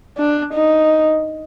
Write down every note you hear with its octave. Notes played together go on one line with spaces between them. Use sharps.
D4
D#4